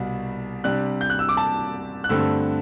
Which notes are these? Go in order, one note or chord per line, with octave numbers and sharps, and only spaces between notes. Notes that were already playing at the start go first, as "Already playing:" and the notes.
Already playing: C2 B2 G3
C3 G3 D4 F#6
G6
F#6
E6
D6
A5
F#6
G2 D3 A3 C4 E6